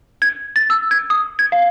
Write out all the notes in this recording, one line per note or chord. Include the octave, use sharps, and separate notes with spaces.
G#6
A6
E6
G#6
D#6
G#6
F5